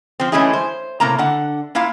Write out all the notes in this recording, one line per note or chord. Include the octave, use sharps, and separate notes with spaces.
F3 C4
E3 G#3 A3 C#4 E4 G#4
C5
A2 C3 A#3 A#5
D3 F#5
A#3 E4 F4 F5